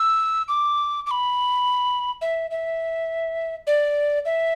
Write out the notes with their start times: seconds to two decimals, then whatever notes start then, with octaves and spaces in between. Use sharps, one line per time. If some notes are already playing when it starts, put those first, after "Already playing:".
Already playing: E6
0.48 D6
1.06 D6
1.11 B5
2.21 E5
2.51 E5
3.67 D5
4.25 E5